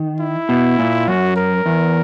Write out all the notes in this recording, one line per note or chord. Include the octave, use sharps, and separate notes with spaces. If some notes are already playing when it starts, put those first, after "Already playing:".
Already playing: D#3
E4
B2
A#2
F#2 F#4
A#4
E2